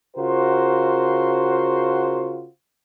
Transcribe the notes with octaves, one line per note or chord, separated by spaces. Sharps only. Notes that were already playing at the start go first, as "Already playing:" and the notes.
C#3 F4 F#4 A#4 C5